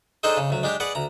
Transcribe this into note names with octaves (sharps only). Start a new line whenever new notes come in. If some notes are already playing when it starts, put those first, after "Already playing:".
D4 D#4 G#4 A4 C5 D#5
C#3
D2 F#3
G#3 D4 G4
G#4 B4 D5 F#5
D2 A#5